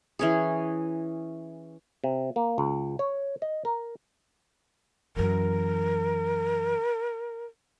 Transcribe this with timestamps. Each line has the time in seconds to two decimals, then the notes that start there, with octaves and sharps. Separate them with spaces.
0.19 E3 C#4 G#4
2.04 C3
2.36 A#3
2.58 C#2
2.99 C#5
3.42 D#5
3.65 A#4
5.16 F#2 E3 A#4